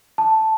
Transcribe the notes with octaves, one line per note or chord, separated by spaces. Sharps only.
A5